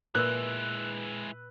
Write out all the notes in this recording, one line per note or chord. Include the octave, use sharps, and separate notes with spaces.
A#2 G#3 E4 B4 E6 F#6